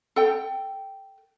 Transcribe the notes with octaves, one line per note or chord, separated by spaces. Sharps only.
A4 G5